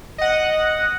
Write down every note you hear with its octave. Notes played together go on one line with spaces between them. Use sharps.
D#5 F#5